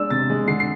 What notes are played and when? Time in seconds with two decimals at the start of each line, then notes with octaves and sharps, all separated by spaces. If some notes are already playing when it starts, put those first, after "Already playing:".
Already playing: G#3 D4 E6
0.10 C3 A6
0.30 G#3
0.48 D3 C7
0.60 C7